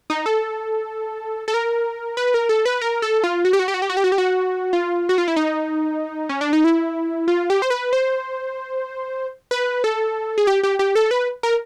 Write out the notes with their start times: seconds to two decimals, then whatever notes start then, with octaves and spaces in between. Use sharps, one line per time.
0.10 D#4
0.26 A4
1.48 A4
1.54 A#4
2.17 B4
2.34 A#4
2.49 A4
2.66 B4
2.81 A#4
3.02 A4
3.24 F4
3.45 F#4
3.53 G4
3.59 F#4
3.68 G4
3.74 F#4
3.82 G4
3.90 F#4
3.97 G4
4.04 F#4
4.12 G4
4.18 F#4
4.73 F4
5.09 F#4
5.18 F4
5.28 E4
5.36 D#4
6.29 C#4
6.41 D4
6.53 D#4
6.64 E4
7.28 F4
7.50 G4
7.62 C5
7.70 B4
7.93 C5
9.51 B4
9.84 A4
10.38 G#4
10.47 G4
10.63 G4
10.79 G4
10.95 A4
11.11 B4
11.43 A#4